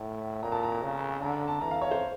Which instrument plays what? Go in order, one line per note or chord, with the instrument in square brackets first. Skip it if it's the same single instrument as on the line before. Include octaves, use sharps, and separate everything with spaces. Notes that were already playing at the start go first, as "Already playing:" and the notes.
Already playing: [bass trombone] A2
[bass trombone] A#2 [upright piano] A#5
[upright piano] A5
A#5
[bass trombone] C#3
[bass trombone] D3 [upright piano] A#5
[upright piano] A5
[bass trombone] E3 [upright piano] A#5
[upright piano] F5
C#5
C5